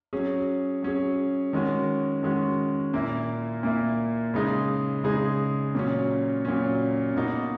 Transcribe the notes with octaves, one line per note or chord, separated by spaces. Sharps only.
F#3 C#4 G#4
F#3 C#4 G#4
D#3 G#3 C#4 F#4
D#3 G#3 C#4 F#4
A#2 A#3 E4
A#2 A#3 E4
C#3 G#3 D#4 G#4
C#3 G#3 D#4 G#4
A#2 F#3 C#4
A#2 F#3 C#4
B2 A#3 D#4 F#4